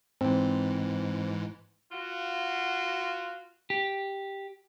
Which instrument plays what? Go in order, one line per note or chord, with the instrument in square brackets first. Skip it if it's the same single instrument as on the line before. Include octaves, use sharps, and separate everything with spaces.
[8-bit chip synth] G#2 E3 [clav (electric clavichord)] C4
[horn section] F4 F#4
[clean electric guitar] G4